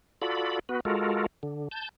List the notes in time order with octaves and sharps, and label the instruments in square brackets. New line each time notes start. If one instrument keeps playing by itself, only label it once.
[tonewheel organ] F4 F#4 A4 D5 B5
B3 F#4 B4
G#3 F4 F#4 A4 A#4
D3
A5 G6